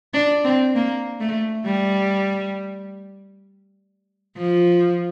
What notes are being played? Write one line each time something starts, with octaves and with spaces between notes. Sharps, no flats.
D4
C4
A#3
A3
G3
F3